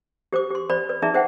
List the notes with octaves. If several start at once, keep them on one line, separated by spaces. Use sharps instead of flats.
G4 C5 C#6 D6
G4 C6
C5 D5 B5
B4 D5
D#4 G#4 D5 E5 A#5
G#4 C5 E5 F#5 G5